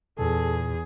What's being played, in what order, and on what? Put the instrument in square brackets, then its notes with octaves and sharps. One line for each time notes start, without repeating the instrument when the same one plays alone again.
[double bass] E2 [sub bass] A#2 [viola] G#4 [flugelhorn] A4